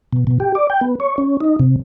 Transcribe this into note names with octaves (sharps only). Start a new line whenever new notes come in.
B2
B2
G4
D5
G5
B3
C#5
C#4
D#4
C3